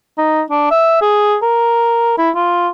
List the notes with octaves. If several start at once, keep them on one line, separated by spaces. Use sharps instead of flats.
D#4
D4
E5
G#4
A#4
E4
F4